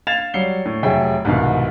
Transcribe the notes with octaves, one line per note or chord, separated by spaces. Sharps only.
F5 G#6 A6 E7 F7
F#3 G3 C7 C#7 G7
A2
F1 F#3 G#4 E5 G5
C2 G#2 B2 D#3 F5